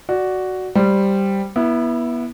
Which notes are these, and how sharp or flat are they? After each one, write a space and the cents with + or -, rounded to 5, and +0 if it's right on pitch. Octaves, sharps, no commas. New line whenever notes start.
F#4 +5 D5 +0
G3 +0 C5 +0
B3 -25 E4 +0